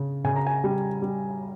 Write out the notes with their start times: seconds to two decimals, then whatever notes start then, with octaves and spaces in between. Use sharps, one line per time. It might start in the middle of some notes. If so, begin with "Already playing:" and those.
Already playing: C#3
0.24 C#3 G#5
0.36 A#5
0.47 G#5
0.64 G3
1.02 G3